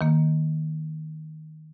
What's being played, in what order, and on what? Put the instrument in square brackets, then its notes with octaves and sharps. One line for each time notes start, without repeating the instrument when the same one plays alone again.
[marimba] D#3 A#3